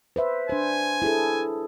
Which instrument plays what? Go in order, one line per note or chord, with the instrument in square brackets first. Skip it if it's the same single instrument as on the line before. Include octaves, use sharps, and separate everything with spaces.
[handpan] B4 C5 E5
[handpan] D4 C5 [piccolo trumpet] G#5
[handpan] E4 G#4 A4